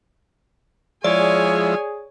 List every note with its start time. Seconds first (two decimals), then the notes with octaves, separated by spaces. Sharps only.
1.04 F3 G#3 E4 G#4 C#5 D5 G#5